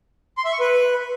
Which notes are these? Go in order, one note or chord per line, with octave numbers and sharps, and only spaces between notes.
C6
E5
C#6
B4